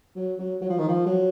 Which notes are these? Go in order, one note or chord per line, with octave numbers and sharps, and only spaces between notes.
F#3
F#3
F#3
F3
D#3
F3
F#3